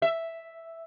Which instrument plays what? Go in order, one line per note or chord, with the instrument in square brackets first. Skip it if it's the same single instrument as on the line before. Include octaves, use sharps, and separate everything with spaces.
[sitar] E5